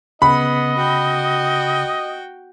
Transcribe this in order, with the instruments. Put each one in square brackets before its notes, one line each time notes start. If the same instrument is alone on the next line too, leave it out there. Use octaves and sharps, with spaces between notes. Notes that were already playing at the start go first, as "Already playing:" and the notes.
[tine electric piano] C#3 [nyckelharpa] B3 F#5 [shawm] D#5 [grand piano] B5
[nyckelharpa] F#4 G5